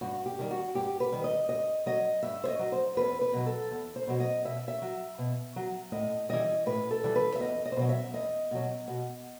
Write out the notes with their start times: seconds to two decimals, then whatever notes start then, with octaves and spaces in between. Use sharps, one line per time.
0.01 G2 F#4
0.26 G4
0.39 D#3 G3
0.51 F#4
0.74 G2 G4
1.00 B4
1.12 D#3 G3
1.24 D#5
1.49 G2 D#5
1.86 F#3 D#5
2.23 G2 E5
2.44 C5
2.48 D#5
2.59 F#3
2.72 C5
2.97 E2 B4
3.21 B4
3.33 B2 F#3
3.46 A4
3.71 E2
3.96 C5
4.07 B2 F#3
4.20 D#5
4.45 B2 E5
4.68 E5
4.82 F#3
5.18 B2
5.56 F#3
5.92 A2 D#5
6.29 E3 G3 D#5
6.66 A2 B4
6.91 A4
7.04 E3 G3
7.16 B4
7.35 E5
7.40 E2 D#5
7.65 D#5
7.72 C5
7.77 B2 F#3 D#5
7.89 E5
8.14 E2 D#5
8.51 B2 F#3
8.88 B2